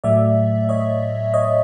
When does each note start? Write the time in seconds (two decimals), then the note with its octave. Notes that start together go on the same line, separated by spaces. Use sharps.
0.04 A2 F#3 A3 D5 E5
0.69 C#5 D#5
1.34 C#5 D#5